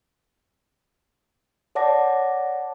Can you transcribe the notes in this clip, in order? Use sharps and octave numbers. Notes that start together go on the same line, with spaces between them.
C#5 D5 F#5 A5 D6 A#6